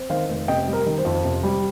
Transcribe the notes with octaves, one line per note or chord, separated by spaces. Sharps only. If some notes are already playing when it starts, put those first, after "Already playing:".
Already playing: C4
D#3 C5 F5
F1
C3 D#5 G5
G3
A#4
D#3
C5
F2
C3
G3